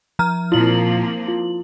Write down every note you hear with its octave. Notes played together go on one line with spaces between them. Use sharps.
F3 A#5 F6
A#2 F3 A#3 C4 E4 F4 F#7
F4